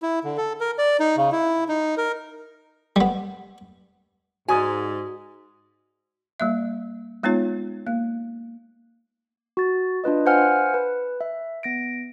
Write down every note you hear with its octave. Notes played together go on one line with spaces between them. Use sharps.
E4
D3
A4
A#4
D5
D#4
C#3
E4
D#4
A#4
G3 B3
G#2 F#4 D5 G#5 D#6
G3 A#3 E5
G#3 B3 D#4 F4 C#5
A#3
F#4 A6
D4 F4 B4 D#5
B4 C5 F5 F#5 G#5 F6
B4
E5
B3 A#6 D7